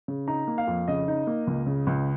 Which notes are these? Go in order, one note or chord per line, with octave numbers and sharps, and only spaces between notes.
C#3
D#4 A#5
A#3
F5
F2
C#3 D#5
D#4
A#3
C#2
C#3
C#2